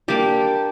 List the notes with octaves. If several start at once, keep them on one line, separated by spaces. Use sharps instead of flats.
G3 A#3 D4 G4